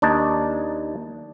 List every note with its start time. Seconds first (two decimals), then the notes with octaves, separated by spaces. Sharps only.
0.02 D#2 D4 D#4 D5